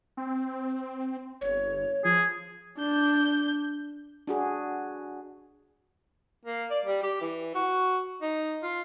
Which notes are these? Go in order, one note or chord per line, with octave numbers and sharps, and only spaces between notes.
C4
G1 C#5
F3 G#4
D4 G6
D4 F#4 G#4
A#3
D5
G3
G4
E3
F#4
D#4
F4